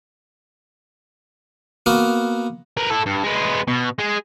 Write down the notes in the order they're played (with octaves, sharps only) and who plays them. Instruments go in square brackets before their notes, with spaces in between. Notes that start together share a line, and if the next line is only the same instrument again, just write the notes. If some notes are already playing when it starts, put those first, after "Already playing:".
[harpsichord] A#3 B3 F#4 A#4
[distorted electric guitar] A#4 B4
E4 A4
G2
G#3 B3
B2
G#3 G#4